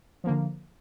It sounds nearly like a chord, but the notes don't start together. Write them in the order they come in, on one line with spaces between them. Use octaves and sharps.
F3 A#3 D3